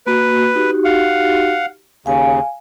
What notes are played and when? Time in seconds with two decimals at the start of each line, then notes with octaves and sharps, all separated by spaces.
0.07 A#3 F#4 B4
0.55 D#4 F#4 G4
0.85 F5 F#5
2.06 D#2 C#3 F5 G#5